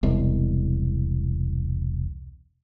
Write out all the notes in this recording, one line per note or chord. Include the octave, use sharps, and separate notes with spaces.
E1 C2